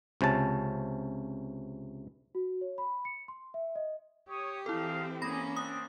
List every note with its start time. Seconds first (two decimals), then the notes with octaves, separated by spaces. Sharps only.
0.21 C#2 C3 C#4 A5
2.35 F#4
2.61 C#5
2.78 B5
3.05 C#7
3.28 C6
3.54 E5
3.76 D#5
4.29 G4 C#5 D#6
4.66 E3 C4 D#4 E4 G#4 A4 F5
5.22 G3 A#3 C#4 G4 G#4 B5 A#6
5.56 C4 D4 D#6